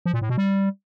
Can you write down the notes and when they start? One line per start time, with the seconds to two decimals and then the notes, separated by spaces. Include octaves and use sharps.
0.06 F3
0.14 A#2
0.22 A2
0.30 B2
0.38 G3